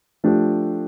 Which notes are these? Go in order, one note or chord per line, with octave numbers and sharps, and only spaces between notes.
F3 A3 D4 G4